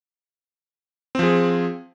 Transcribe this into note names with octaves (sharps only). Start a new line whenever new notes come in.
F3 C4 G#4